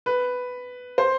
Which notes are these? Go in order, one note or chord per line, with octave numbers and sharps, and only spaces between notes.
B4
C5